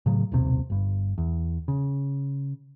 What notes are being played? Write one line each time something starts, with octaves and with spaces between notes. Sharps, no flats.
A2 C#3 F#3
D#1 B1 C3
G1 G2
E2
C#3